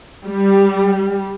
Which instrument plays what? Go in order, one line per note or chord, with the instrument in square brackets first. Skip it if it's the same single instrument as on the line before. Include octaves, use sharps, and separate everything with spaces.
[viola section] G3